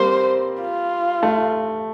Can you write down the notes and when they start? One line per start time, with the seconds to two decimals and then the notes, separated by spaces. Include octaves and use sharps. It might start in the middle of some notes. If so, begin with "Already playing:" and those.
Already playing: G3 A#3 C4 C5
0.63 F4
1.23 A3